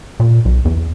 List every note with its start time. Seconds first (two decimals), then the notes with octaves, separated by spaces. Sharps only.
0.20 A#2
0.45 B1
0.65 E2